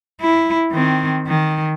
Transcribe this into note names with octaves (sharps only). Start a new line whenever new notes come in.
E4
D#3 C4
D#3